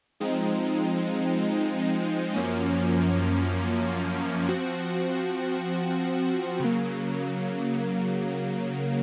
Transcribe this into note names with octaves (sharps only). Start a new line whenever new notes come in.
F3 G#3 C4 D#4
F#2 F3 A#3 C#4
F3 C4 F#4
C#3 F#3 A#3